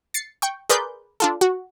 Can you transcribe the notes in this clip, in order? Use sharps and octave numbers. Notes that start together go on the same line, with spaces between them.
A6 C7 C#7
G5 C#6
G#4 A#4 B4 D5 C6 G6
D4 F4 A4
F#4